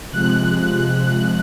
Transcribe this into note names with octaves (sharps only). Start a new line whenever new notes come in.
C3 F3 G#3 F#6